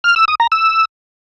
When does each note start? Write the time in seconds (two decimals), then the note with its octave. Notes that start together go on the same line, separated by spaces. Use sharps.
0.04 F6
0.16 E6
0.28 D#6
0.40 A#5
0.52 E6